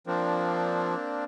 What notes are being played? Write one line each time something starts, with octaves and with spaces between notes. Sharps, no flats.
F3 A#3 C4 D4